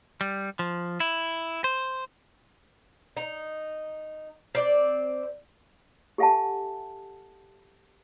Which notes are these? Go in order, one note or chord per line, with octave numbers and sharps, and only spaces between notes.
G3
F3
E4
C5
D#4
C4 D5
G4 A4 E5 F#5 G#5 A5